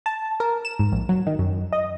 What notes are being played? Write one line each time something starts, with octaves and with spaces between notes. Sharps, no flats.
A5
A#4
E7
G#2
A#1
F#3
D#3
F#2
D#5